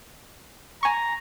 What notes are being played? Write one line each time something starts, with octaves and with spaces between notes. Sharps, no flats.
G#5 A#5 C#6